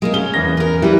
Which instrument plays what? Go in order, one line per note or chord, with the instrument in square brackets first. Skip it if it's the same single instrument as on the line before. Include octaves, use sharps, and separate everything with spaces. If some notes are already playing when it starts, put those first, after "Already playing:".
[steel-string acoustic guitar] G#3 A#3 D#4
[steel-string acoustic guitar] C#4 [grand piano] G7
[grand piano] E2 A#6
[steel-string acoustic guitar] A#4 B4
[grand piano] E3 [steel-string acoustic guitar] G3 B4